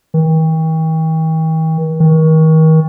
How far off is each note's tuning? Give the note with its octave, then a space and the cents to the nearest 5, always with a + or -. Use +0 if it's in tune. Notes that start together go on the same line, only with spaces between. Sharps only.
D#3 +45
D#3 +35